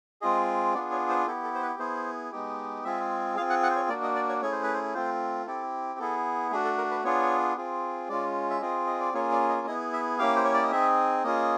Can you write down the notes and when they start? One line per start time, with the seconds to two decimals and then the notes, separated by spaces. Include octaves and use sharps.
0.22 G#3 C4 F4 G#4 D#5
0.74 B3 D4 F4 G#4 D5
0.92 C#5
1.09 C5
1.27 B3 E4 G4 A4
1.44 A4
1.55 C5
1.62 B4
1.79 B3 E4 G#4 C5
2.32 G#3 B3 D#4 G4
2.84 G#3 C4 F4 G#4 E5
3.37 C4 F4 G#4 F5
3.50 F#5
3.63 F#5
3.70 C5
3.76 C#5
3.89 A#3 D4 F#4 D5
4.03 D#5
4.15 D5
4.29 C#5
4.42 A3 C#4 E4 G#4 C#5
4.52 C5
4.63 B4
4.74 C5
4.94 A3 C4 F4 C5
5.47 C4 E4 G4 A4
5.99 B3 E4 G#4 A4
6.52 A3 D4 F#4 G#4
6.65 A4
6.78 A#4
6.91 B4
7.04 B3 D4 F4 G#4 C#5
7.57 C4 F4 G#4
8.09 G#3 C#4 F4 D5
8.50 E5
8.61 C4 F4 G#4 D#5
8.87 D#5
9.00 D5
9.14 A#3 C#4 F4 G#4 C#5
9.32 D5
9.49 D#5
9.67 B3 E4 G#4 D#5
9.93 E5
10.19 A#3 C#4 E4 G4 F5
10.36 C5
10.44 C#5
10.54 D5
10.62 D#5
10.71 C4 D#4 G#4 E5
11.24 A#3 C#4 F4 G#4 D#5